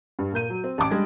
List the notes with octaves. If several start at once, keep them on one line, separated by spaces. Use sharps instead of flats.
G2
A#2 A#3 G6 D#7
F#3
C4
A1 A5 D6 D7
G3 G#3 D4 G#6